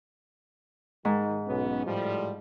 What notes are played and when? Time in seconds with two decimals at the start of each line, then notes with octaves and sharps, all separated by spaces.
1.05 G#2 D#3
1.46 B1 B3 C#4
1.84 A2 F3 G3